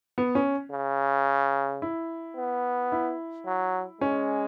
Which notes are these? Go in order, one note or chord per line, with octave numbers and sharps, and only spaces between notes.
B3
C#4
C#3
E4
B3
E4
F#3
G#3 C#4